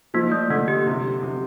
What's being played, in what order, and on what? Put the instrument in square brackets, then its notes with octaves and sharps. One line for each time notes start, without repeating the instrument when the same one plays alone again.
[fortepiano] F3 [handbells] A#3
[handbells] A3
[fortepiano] D3 [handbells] A#3
[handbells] G4
[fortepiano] C3
C3